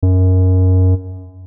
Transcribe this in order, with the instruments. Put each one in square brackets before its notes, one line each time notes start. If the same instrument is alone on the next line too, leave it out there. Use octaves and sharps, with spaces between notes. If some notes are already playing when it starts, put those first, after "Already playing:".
[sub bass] F#2